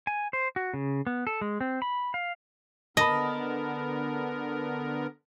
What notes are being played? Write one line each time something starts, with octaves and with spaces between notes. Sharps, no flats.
G#5
C5
F#4
C#3
B3
A4
G#3
C4
B5
F5
D3 B3 A#4 D#5 A5 B5